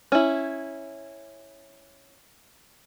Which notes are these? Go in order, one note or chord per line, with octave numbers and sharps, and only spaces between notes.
C#4 E4